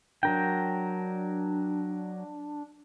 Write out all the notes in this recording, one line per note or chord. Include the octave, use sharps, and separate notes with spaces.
F#3 D4 A#4 G5